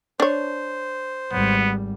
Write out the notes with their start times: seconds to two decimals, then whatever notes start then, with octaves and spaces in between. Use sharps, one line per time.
0.20 D4 C5 C#5
1.32 G#1 G3 B3